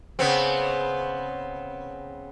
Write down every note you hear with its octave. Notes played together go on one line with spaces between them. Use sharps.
C#3 B3 C4